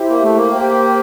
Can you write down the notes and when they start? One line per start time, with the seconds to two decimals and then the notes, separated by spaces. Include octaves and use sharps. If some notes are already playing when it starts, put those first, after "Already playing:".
Already playing: E4 G4 C5 E5
0.09 A#3
0.22 A3
0.36 A#3
0.50 G4 C5 G5